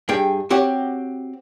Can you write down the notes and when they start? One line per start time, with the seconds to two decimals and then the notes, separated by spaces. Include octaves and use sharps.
0.09 G2 G#4 G5
0.50 C4 F#4 G4 C#5